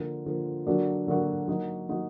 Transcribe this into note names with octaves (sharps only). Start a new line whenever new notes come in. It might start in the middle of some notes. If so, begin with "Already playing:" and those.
Already playing: D3 F3 A#3
D3 F3 A#3
D3 F#3 A#3 D4 F#4
D3 F#3 A#3 D4 F#4
F#3 A#3 D#4 F#4
F#3 A#3 D#4 F#4